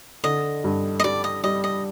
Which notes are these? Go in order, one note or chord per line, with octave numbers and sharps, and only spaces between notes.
D3 D#5
G2
D#5
G3 D5
D#5
G3 D#5
D#5